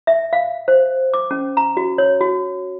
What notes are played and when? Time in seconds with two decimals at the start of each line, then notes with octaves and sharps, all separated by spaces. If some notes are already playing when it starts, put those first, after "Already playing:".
0.07 E5
0.33 F5
0.68 C5
1.14 D6
1.31 C#4
1.57 A#5
1.77 F#4
1.98 C#5
2.21 F#4